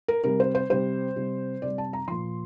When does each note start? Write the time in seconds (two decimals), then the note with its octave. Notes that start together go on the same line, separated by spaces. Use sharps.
0.08 A#4
0.24 C3 G3 A#4
0.40 C5
0.55 C5
0.70 C3 G3 C5
1.16 C3 G3
1.62 C3 G3 D5
1.78 A5
1.93 A#5
2.08 A#2 F3 C6